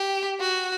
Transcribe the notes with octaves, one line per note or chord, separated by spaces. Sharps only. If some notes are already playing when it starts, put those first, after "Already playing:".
Already playing: G4
F#4